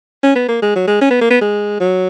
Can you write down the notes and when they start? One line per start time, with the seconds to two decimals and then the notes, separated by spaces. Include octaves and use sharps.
0.23 C#4
0.35 B3
0.48 A#3
0.62 G#3
0.75 F#3
0.87 G#3
1.01 C#4
1.11 B3
1.21 A#3
1.30 B3
1.41 G#3
1.80 F#3